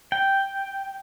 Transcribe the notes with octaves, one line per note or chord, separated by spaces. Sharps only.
G5